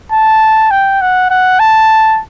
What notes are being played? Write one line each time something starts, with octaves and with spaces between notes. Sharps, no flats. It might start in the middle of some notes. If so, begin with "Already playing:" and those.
A5
G5
F#5
F#5
A5